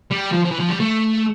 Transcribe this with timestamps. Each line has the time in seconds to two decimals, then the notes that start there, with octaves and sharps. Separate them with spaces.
0.11 G3
0.31 F3
0.45 F3
0.51 E3
0.59 F3
0.69 G3
0.80 A3